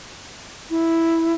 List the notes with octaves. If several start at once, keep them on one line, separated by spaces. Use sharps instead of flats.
E4